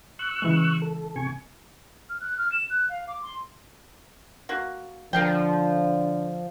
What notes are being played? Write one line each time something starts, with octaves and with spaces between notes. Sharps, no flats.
C#6 E6 F#6
C#3 E3 G#3
A4
C3 G#5 C#6
F6
F#6
F6
E7
F#6
F5
D6
C6
A#3 F#4
D3 F3 A#4 F5 G5